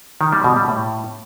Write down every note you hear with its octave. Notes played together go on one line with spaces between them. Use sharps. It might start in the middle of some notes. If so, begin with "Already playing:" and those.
D#3
G3
B2
G3
A2